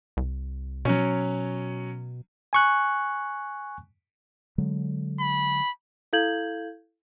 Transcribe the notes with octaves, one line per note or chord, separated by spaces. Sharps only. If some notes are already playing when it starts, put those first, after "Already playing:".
C2
B2 F#3 C#4
G#5 C#6 F#6
D3 F#3 G#3
B5
E4 A4 F5 G6 G#6 F#7